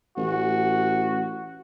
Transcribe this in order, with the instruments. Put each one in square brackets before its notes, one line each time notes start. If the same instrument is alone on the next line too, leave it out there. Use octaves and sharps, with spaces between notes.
[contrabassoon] A1 [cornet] F#4